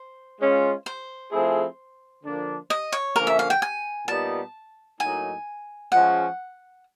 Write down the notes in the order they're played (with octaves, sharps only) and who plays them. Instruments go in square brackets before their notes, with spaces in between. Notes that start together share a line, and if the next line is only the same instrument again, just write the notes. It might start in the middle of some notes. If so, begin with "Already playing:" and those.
Already playing: [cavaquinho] C5
[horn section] G#3 C#4 F4
[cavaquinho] C5
[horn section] F3 A3 C4 E4 G#4
D3 F3 A#3 D4
[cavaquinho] D#5
C#5
[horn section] D3 F3 A#3 C#4 [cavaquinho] A#4
[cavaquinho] E5
F5
G5
G#5
[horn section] A#2 G3 B3 D#4 [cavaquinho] A5
[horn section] A2 F#3 A#3 D#4 [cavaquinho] G#5
[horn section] F3 G#3 C#4 [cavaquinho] F#5